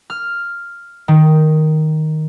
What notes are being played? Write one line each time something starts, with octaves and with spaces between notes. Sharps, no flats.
F6
D#3